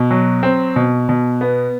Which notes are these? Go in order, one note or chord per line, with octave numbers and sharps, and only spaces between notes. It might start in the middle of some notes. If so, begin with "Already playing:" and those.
Already playing: B2
F#3
C4
B2
B2
B3